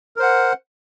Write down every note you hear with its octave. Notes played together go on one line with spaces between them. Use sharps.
A#4 C5 F#5